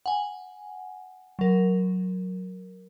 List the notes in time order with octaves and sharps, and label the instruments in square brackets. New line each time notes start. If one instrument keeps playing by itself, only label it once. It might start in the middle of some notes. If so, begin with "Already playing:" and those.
[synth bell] F#5 G#5
F#3 A#4